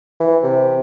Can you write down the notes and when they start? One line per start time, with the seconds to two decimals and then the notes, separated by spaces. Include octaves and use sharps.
0.20 E3
0.43 C3